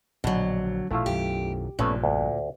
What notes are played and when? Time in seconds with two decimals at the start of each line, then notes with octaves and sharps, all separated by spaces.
0.24 A#1 B2 D3 F#3
0.91 A#1 B2 A3 E4 F4
1.06 B1 F#2 D#3 G4
1.79 A#1 G2 A#2 A3 B3 C#4
2.04 D2